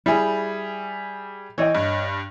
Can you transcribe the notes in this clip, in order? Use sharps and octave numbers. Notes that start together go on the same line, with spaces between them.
G3 E4 G#4
E3 C#5 D#5 G5
G2